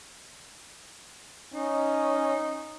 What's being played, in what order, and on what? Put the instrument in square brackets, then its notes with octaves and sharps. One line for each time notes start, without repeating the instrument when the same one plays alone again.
[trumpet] C#4 [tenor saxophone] D#4